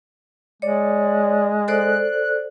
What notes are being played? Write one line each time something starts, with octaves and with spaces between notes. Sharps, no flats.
G#3 C#5 D5
A4 C5 D5 F#6